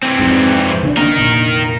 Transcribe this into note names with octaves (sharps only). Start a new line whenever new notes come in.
E3 C4
F2 G#2
C#3 C4 D4
A#3 D4 D#4 A#4
F1 D#2 A#2